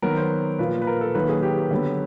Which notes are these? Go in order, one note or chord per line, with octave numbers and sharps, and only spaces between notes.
D#3 F#3 B3 A#4
C5
A#2 F3 A#3 B4
B4
A#4
A4
D#3 F#3 A#3 B4
G#4
G4
D3 F#3 B3